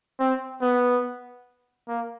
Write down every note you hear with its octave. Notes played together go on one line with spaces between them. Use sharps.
C4
B3
A#3